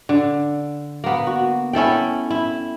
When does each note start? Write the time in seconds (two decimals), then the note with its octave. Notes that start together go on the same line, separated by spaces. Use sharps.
0.09 D3
1.04 A#3 B3
1.27 F#4
1.73 C#4 E4 A4 G5
2.30 E4